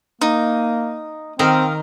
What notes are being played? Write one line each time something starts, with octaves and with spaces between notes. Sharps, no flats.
A#3 D#4
D#3 C4 A#4 D#5 F5 A#5